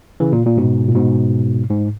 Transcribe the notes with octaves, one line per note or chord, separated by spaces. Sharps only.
C#3 E3
A#2
A#2
G#2 B2
A#2
G#2 B2
G#2